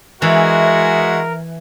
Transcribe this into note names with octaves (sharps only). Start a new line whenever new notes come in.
E3 G#3 F#4 A#4 E5